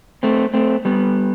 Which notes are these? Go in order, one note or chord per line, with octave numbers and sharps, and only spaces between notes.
A3 C4
A3 C4
G3 B3